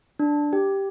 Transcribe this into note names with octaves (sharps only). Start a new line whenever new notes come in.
D4
G4